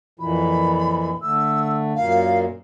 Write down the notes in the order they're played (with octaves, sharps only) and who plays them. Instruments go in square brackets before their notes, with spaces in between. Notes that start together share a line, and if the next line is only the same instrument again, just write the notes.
[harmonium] F2 A#2 E3 [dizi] B5
[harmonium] D3 A3 [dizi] E6
[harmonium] F#2 A#2 A#3 [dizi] F5